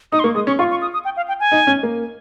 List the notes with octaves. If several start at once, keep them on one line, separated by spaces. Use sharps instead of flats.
D#4 D#6
C6
A#3 C#6
G#3 D#6
C#4 C#6
F4 C#6
C#6
D#6
D#6
G5
F5
G5
G#5
D#4
C#4
A#3